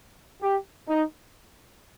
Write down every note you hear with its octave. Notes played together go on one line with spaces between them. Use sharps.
G4
D#4